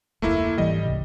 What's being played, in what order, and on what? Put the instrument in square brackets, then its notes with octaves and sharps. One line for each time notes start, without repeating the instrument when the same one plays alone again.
[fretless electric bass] F1 D2 [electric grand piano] A3 A#3 E4
[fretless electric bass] G#2 E3 F#3 [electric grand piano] G3 D#5
[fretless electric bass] C#2 G2 C3